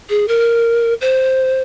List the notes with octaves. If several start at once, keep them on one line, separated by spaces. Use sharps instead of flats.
G#4
A#4
C5